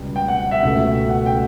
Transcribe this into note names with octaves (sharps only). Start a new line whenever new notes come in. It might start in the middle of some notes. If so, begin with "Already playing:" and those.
Already playing: C#2 B2 G3
G5
F#5
E5
C#2 B2 A3 E5
F#5
G5